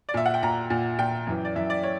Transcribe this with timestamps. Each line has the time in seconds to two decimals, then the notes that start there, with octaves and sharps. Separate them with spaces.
0.09 D5
0.14 A#2 E5
0.26 F#5
0.34 G5
0.43 A#2 A#5
0.70 A#2
0.99 A#2 G5
1.27 F#2 E3
1.45 D5
1.55 F#2 E3 E5
1.70 D5
1.84 C#5